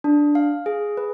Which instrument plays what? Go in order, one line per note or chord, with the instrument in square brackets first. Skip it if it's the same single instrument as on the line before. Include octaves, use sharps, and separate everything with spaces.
[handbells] D4
F5
G#4
B4